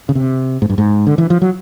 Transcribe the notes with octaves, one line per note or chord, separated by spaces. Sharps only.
C#3
C3
G#2
G2
G#2
D3
E3
F3
F#3